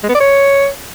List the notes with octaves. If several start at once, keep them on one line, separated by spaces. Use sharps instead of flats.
G#3
B3
D5
C#5